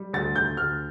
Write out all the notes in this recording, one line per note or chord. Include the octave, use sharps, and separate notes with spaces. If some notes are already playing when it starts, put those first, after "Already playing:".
Already playing: G3
D2 A6
D2 G6
D2 F6